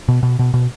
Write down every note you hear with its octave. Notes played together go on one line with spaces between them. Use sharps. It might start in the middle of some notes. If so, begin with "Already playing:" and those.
B2
B2
B2
B2